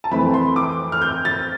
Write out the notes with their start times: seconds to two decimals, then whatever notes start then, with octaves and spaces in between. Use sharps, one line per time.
0.04 A5
0.11 F2 E3 A3 C4 B5
0.34 C6
0.56 D6
0.92 F6
1.02 G6
1.25 A6